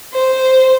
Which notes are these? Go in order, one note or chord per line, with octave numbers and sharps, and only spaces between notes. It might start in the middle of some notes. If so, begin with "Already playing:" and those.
C5